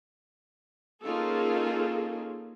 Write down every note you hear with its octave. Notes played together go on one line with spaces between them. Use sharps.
A#3 C#4 D#4 F4 G#4 A4